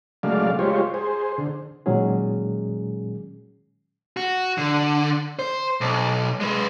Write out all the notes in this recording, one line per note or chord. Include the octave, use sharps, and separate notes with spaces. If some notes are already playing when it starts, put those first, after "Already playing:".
C#3 F#3 G#3 A3 D5 F5
G#3 F4 G4 C5 C#5
G#4 C5
D3
A#2 D#3 F#3 G#3 C#4 G#4
F#4
D3
C5
B1
G#3 B4